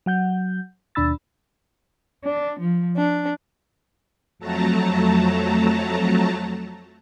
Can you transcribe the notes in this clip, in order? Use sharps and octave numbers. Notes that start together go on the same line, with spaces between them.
F#3 F#5 G6
D#2 B2 D4 B5 E6 A6
D4
F3
D4
F2 F#3 A3 A5 A#5